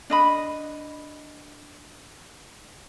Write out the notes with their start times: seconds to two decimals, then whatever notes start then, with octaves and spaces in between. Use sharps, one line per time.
0.10 D4 D#5 B5